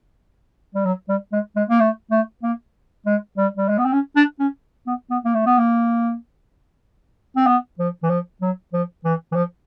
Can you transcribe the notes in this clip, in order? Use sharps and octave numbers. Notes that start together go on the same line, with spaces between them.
G3
F#3
G3
G#3
G#3
A#3
A3
A3
A#3
G#3
G3
G3
G#3
B3
C4
C#4
D4
C#4
B3
B3
A#3
A3
B3
A#3
C4
B3
F3
E3
F3
F#3
F3
E3
E3
F3